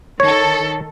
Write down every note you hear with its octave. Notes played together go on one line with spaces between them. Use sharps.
D#3 A4 C#5